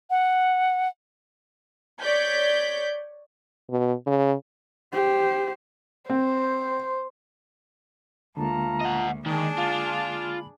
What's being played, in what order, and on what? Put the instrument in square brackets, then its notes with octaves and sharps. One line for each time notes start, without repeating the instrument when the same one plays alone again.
[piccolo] F#5
[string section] C#5 D5 G6 B6
[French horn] B2
C#3
[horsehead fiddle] G4 C5
[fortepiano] C4 [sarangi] C5
[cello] D2 [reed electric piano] D3 G#3 A#3 [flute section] F4 A5 A#5
[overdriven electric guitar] D#5 F#5
[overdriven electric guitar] D#3 [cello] D4 G#4 [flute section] A5
[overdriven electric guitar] F4
[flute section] B5